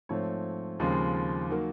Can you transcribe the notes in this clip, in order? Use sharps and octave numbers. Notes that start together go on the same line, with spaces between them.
G#2 F3 A3 C4 C#5
D#2 C#3 F3 G#3 C4
D#3 F#3 A#3